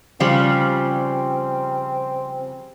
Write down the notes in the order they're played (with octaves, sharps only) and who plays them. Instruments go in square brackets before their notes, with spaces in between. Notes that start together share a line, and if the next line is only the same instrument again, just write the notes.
[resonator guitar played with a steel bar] C#3 F3 G3 [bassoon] C4